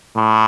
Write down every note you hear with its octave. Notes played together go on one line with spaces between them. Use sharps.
A2